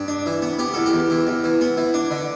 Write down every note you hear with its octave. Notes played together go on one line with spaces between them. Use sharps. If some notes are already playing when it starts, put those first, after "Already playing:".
Already playing: G2
D4
E3
B3
B3 G4
E2 A4
G4
E2
E3
E2
E3
B3
E3
D4
D3